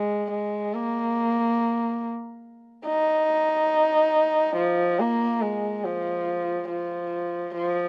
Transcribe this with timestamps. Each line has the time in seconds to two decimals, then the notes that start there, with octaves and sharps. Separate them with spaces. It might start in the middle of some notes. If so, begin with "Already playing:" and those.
Already playing: G#3
0.31 G#3
0.74 A#3
2.87 D#4
4.56 F3
5.00 A#3
5.41 G#3
5.85 F3
6.69 F3
7.55 F3